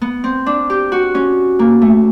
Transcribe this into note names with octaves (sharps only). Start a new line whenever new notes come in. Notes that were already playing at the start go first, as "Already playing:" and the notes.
B3
C4
D4
G4
F#4
C#4
A#3
A3